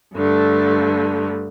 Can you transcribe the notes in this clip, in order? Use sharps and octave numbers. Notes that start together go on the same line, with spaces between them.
G2 D3 A3